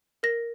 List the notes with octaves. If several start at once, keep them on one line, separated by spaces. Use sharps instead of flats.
A#4 A#6